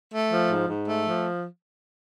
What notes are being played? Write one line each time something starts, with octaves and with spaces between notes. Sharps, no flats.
A3
F3
G#2
G#2
A3
F3